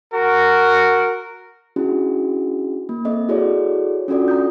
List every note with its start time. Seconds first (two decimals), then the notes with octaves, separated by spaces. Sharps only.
0.13 F#4 A#4
1.76 C#4 D4 E4 F#4 G#4
2.89 A#3
3.05 C4 A4 D#5 E5
3.29 E4 F#4 G#4 A4 C#5 D5
4.08 C#4 D4 F4 F#4 A4 D5
4.28 A#5 D#6 G6